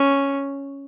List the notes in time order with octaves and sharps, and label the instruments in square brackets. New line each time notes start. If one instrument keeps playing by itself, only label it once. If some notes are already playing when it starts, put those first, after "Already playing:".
Already playing: [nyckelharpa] C#4